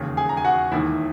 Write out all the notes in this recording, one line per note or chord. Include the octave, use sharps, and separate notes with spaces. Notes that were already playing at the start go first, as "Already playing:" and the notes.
Already playing: E1 D#2 C#3
G#4 G#5
A#5
G#5
F#4 F#5
E1 D#2 D#3 E4 E5